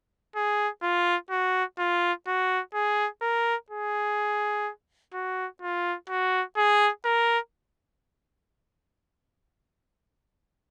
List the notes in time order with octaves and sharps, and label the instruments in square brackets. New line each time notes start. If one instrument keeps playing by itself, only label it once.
[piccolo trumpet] G#4
F4
F#4
F4
F#4
G#4
A#4
G#4
F#4
F4
F#4
G#4
A#4